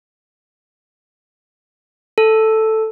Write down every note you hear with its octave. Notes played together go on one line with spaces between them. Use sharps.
A4